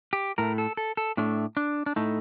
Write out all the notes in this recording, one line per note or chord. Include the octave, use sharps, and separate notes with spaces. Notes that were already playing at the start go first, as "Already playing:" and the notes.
G4
A2 A3 A#4
A4
A4
A4
A2 A3 D4
D4
D4
A2 A3 D#4